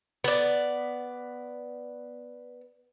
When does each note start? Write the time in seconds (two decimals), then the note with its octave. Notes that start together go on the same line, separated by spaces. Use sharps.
0.24 B3 D5